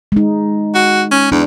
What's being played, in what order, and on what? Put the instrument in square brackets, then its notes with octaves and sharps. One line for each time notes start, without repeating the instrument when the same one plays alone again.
[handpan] G#3 D#4
[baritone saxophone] F#4
C#4
[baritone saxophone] E2 [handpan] D4